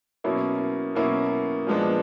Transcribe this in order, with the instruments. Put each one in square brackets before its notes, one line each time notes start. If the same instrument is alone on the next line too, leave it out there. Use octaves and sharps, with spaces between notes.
[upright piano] B2 F#3 A#3 C#4 E4
B2 F#3 A#3 C#4 E4
A#2 F3 G#3 B3 D4